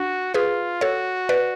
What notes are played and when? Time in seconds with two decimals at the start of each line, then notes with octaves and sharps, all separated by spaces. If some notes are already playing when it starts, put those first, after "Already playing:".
Already playing: D4 F#4
0.34 F4 G#4 B4
0.81 F#4 A4 C#5
1.29 B4 D5